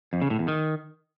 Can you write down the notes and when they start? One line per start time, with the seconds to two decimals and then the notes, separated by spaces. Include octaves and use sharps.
0.13 F2
0.22 C#3
0.30 A2
0.39 E2
0.48 D#3